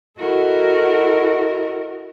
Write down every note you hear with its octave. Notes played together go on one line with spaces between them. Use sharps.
E4 F#4 A4 A#4 D#5